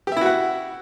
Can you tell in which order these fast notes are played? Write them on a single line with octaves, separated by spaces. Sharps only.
G4 E5 E4 F#4 F#5